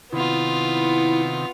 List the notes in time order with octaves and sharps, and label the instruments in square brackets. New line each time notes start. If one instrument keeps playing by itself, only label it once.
[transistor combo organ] C3 D#3 [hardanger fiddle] B3 F4 [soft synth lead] E4